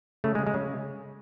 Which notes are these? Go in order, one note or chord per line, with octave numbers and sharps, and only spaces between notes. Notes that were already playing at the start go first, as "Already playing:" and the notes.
C#3 A3
G#3
C#3
G#3
C#3